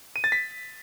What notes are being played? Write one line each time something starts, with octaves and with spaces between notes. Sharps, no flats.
D#7
A6
B6